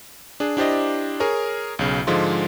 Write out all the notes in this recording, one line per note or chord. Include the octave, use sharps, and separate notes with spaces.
D4 G#4
D4 E4 G4 C5 D5 D#5
G#4 A#4 C#5
B1 C#3
G#2 D3 F3 G#3 F4 C6